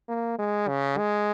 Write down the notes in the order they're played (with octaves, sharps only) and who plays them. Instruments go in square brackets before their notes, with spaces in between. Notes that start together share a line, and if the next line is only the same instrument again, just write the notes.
[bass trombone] A#3
G#3
C#3
G#3